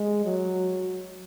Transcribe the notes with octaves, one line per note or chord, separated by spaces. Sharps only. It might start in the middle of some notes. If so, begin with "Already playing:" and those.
Already playing: G#3
F#3